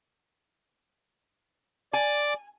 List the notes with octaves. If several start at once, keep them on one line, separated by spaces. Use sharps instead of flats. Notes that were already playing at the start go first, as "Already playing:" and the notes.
D5 G#5 D6